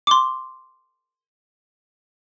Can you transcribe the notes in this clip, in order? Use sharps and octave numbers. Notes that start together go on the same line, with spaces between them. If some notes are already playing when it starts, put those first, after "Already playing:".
C6 D6